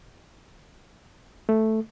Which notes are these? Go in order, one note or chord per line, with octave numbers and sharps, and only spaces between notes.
A3